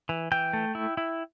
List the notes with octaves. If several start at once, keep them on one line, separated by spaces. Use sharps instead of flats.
E3
E3 G5
A3
E4
E4